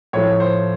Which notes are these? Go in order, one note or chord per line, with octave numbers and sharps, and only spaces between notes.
A2 F3 A3 C#5
C5